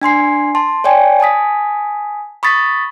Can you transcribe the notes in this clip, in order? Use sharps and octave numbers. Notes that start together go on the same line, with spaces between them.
D4 G#5 C6 C7
A5 C6
C#5 D5 G5 G#5
G#5 A5 D#6 B6
B5 C#6 D#6 A6 B6